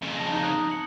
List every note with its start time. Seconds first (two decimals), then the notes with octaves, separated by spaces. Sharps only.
0.02 F2 C#3
0.17 A5 A#6
0.30 D#4
0.42 D#6 F#6 G#6
0.71 C#7 F#7